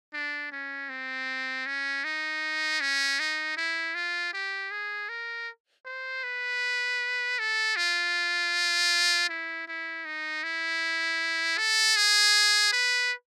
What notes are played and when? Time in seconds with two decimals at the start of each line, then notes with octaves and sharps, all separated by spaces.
0.14 D4
0.52 C#4
0.90 C4
1.66 C#4
2.04 D#4
2.81 C#4
3.19 D#4
3.57 E4
3.95 F4
4.33 G4
4.71 G#4
5.09 A#4
5.86 C5
6.24 B4
7.39 A4
7.76 F4
9.29 E4
9.68 E4
10.05 D#4
10.44 E4
11.58 A4
11.96 G#4
12.73 B4